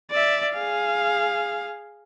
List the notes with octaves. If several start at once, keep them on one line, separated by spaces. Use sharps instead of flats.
D5 E5
G#4 F5